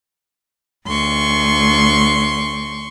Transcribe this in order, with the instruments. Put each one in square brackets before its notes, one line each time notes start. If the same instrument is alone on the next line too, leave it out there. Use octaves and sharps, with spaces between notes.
[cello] D2 [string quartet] C6 C#6